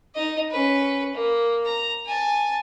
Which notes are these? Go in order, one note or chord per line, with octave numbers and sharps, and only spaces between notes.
D#4 D#5
C#4 B4
A#3
A#5
G#5 A5